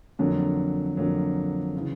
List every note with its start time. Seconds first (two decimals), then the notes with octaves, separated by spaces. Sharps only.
0.19 F2 D3 F#3 A#3
0.97 F2 D3 F#3 A#3
1.77 C#3 E3